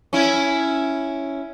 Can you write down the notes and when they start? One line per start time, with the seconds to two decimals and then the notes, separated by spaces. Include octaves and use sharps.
0.13 C#4 E4